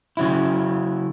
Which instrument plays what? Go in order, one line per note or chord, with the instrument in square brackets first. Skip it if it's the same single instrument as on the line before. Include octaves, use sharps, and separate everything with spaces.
[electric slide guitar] C#3 F#3 E4